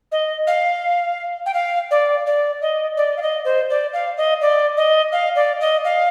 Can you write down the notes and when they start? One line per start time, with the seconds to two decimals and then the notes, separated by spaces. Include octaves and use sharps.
0.12 D#5
0.47 F5
1.46 G5
1.54 F5
1.91 D5
2.27 D5
2.62 D#5
2.97 D5
3.17 F5
3.22 D#5
3.45 C5
3.70 D5
3.93 F5
4.17 D#5
4.41 D5
4.77 D#5
5.12 F5
5.36 D5
5.60 D#5
5.85 F5